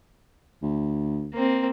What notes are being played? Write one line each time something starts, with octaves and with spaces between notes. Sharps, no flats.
D2
A#3 C4